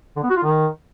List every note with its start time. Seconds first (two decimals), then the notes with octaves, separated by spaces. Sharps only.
0.16 D3
0.23 B3
0.30 F#4
0.36 F4
0.43 D#3